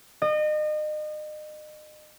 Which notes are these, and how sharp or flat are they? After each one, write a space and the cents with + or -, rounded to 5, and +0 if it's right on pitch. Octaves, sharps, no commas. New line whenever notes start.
D#5 -35